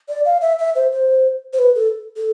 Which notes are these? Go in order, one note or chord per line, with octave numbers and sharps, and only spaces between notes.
D5
F5
E5
E5
C5
C5
C5
B4
A4
A4